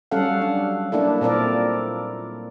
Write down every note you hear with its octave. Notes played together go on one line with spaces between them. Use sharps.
F#3 G3 C#4 A4 F5 F#5
D4
A#3 D4 E4 A4
A#2 C4 A4 A#4 D5